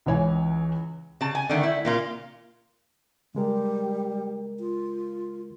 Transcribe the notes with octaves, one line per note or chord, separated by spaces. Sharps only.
C#2 E3 C#5 G#5
C#3 A5
G#5
D3 D#3 A3
E4
A#2 A#3 F4
C#3 G3 G#3 A#4
F4